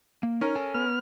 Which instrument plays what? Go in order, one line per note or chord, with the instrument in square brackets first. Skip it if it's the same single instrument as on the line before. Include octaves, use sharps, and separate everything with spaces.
[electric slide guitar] A#3
[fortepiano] C#4 A#4 [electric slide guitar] D#4
[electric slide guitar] A4 G#5
[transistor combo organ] B3 F6